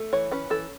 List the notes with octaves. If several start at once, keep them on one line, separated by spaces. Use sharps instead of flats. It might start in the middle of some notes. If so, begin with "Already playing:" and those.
Already playing: A3
E3 C#5
C#4 B4
E3 A4